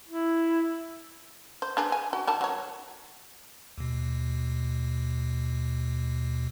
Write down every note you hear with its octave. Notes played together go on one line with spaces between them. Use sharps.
E4
C5
D4 G#4 B4
G#5
F#4
D3 D#3 A5
F#3 C#5
D#2 B2